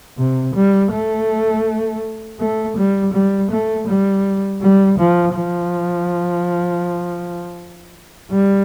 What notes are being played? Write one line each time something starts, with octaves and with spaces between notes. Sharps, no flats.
C3
G3
A3
A3
G3
G3
A3
G3
G3
F3
F3
G3